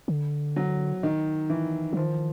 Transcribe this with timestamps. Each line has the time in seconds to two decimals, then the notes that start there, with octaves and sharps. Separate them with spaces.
0.08 D3
0.56 F#3
1.03 D#3
1.50 E3
1.93 E3
1.97 D#3 F3